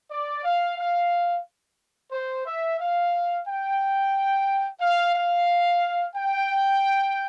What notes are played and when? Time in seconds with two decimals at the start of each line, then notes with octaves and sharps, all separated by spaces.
0.11 D5
0.44 F5
0.78 F5
2.12 C5
2.46 E5
2.79 F5
3.47 G5
4.81 F5
5.15 F5
6.15 G5